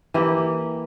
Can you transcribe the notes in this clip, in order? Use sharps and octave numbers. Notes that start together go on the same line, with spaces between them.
E3 A#3 G4